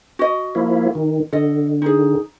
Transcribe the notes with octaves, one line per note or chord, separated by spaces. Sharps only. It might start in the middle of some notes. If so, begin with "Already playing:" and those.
F#4 D#5
F3 A#3 E4
D#3
D3 A4 D#5
D#4 G#4